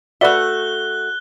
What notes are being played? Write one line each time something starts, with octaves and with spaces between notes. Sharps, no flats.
A3 F#4 B4 D5 E5 F#6 G7